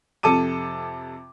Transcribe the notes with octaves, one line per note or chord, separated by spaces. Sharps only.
F2 C3 A4 A5 D6 D#7